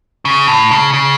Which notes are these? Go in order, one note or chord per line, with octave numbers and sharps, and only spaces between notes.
C#3
A2
C#3
C#3